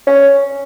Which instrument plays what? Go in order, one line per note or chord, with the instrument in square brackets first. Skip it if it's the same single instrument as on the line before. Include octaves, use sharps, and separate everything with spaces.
[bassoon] C#4